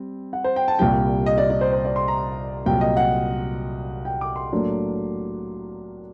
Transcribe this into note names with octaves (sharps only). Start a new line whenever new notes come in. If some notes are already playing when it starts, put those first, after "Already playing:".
Already playing: G3 C4
F#5
C5
G5
A5
C2 A#2 G3 G5
D#5
D5
D5
C5
C5
D5
C6
A#5
C2 A#2 F#3 G5
D#5
F#5
G5
D6
C6
A2 F#3 A#3 D4